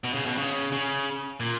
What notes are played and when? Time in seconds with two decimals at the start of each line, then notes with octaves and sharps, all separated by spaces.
0.05 B2
0.15 C#3
0.26 B2
0.38 C#3
0.72 C#3
1.40 A#2